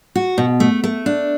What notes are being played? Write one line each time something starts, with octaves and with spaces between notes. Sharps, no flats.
F#4
B2
A3
A3
D4